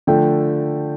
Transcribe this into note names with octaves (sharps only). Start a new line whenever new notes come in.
D3 F3 A3 G5